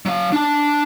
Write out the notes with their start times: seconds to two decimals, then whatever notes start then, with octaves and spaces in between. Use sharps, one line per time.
0.06 F#3 F5
0.32 D4 A5